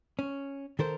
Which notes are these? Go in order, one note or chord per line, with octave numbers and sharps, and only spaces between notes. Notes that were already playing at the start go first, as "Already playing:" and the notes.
C#4
D#3 A4 A#4 C5